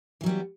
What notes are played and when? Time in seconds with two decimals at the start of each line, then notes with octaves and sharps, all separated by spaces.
0.21 E3
0.24 F#3
0.26 G3
0.29 B3